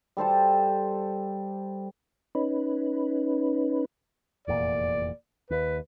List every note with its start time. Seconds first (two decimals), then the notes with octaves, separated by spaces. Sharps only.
0.17 G3 A4 C5 A5
2.35 C#4 D#4 B4
4.48 F1 E2 A#2 D5
5.50 D#2 B4